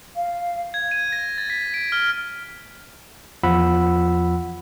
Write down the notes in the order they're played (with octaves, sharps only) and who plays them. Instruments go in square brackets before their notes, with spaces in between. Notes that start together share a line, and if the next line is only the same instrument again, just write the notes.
[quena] F5
[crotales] G#6
D#7
A#6
A6
B6
D7
F6
[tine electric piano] E2 F3 F4 F#5 B5 E6